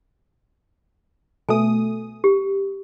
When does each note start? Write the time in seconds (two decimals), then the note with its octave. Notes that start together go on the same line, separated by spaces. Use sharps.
1.49 B2 A3 G#5 D#6
2.24 G4